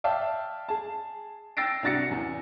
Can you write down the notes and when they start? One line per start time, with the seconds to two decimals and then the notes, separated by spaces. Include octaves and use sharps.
0.04 D5 E5 F5 G5 A5
0.69 G#4 A5
1.57 G5 E6 A6 A#6 C7 D7
1.83 C2 D4 F#4 A6 A#6 C#7
2.10 A1 E2